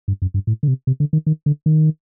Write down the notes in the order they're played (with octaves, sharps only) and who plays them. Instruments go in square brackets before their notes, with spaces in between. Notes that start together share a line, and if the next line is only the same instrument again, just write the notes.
[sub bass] G2
F#2
G2
A2
D3
C3
C3
D3
D#3
D#3
D3
D#3